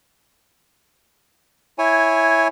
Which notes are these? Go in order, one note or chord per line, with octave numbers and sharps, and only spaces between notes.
E4 C#5 G#5